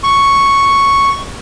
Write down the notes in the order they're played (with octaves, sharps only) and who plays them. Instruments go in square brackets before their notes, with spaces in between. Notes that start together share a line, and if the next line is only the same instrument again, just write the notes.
[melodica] C#6